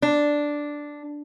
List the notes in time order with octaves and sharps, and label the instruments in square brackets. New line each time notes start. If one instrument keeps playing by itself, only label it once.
[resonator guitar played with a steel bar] D4